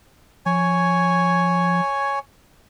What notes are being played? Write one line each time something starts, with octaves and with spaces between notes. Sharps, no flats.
F3 C#5 G#5